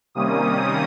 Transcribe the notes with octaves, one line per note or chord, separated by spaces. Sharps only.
C3 D#3 G3 A#3 C#4 D#6